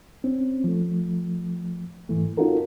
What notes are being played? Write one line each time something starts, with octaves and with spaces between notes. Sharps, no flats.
C4 C#4
F3 A3
G#2 E3 A3
C#4 D#4 F4 F#4 A4 A#4